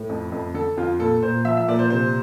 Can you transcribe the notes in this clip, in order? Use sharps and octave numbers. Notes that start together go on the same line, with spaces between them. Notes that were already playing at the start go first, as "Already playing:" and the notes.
Already playing: A2
F2
F2
D3 A4
F2 F4
A#2 A4
A#2 C5
F3 E5
E5
A#2 D5
C5
C3 C5